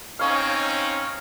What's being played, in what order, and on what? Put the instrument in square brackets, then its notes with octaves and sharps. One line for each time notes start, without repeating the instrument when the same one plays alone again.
[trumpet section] C4 C#4 D#4 [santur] C#5 F5